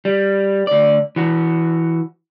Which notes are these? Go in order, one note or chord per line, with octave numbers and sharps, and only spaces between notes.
G3
D2 D5
E3 F#4